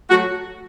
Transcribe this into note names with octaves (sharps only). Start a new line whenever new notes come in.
F#3 A3 F#4